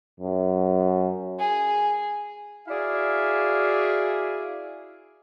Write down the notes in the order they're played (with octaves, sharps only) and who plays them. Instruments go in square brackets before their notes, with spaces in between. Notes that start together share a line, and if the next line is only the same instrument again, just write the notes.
[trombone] F#2
[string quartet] G#4
[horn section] E4 F#4 G#4 D5 E5 F5